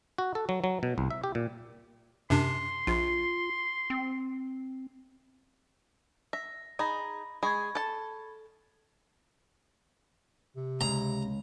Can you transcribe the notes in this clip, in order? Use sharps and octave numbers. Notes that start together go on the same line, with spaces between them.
F#4
A4
F#3
F#3
B2
C2
E5
G4
A#2
F#2 C3 D4 C6
A#1 F4
C4
E5 A#6
D#4 G#4 A#5 B5 A#6
G#3 G#4 B5 C#6 G#6
A4 A5
C3
C#2 A#5